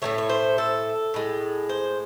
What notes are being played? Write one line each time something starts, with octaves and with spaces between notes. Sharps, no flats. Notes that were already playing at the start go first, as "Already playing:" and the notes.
A2 F#3 A3 C#5
C#5
C5
A4
A2 G#3
C5